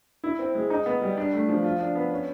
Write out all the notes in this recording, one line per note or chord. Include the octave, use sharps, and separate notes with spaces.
E4
C4
G#3
D#4
B3
G3
D4
A3
F3
F4
D4
B3
C#4